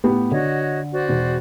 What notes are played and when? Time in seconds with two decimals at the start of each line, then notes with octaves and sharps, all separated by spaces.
0.04 A2 B3 G4
0.32 D3 F#4 C#5 D#5
0.93 F#4 C5 D5
1.09 E1